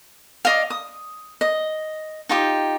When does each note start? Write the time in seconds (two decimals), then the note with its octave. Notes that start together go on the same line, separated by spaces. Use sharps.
0.45 D5 D#5 F5
0.70 D#6
1.41 D#5
2.29 D#4 F4 G4